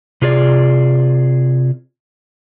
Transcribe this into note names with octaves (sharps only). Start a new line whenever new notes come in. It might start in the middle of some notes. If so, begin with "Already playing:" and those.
C3 F4 G#4 C#5 D5